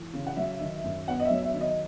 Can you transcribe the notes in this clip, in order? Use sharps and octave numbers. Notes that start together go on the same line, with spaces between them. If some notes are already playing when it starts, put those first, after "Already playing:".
Already playing: E3
C#3
F#5
F#3 E5
D#3
F#2
B3 F#5
D#5
E5
F#3
E5
D#3
D#5